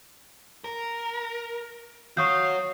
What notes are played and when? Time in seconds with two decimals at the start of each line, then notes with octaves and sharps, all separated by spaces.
0.64 A#4
2.17 F#4 C#5 F5 C#6 D#6 G6